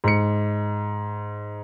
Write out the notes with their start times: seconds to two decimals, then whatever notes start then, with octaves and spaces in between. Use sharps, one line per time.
0.04 G#2 C#7